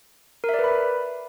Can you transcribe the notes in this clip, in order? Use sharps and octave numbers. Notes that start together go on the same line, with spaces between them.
A#4
E5
D5
B4
B5